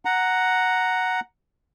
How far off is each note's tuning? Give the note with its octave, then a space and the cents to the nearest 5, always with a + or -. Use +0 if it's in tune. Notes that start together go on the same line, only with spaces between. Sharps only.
F#5 +0 A#5 +0